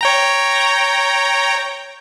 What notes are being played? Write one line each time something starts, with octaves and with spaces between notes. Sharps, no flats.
C#5 G5 A#5